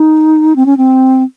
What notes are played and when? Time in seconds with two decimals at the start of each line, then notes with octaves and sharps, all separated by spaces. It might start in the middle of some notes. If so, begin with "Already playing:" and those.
Already playing: D#4
0.56 C4
0.66 C#4
0.77 C4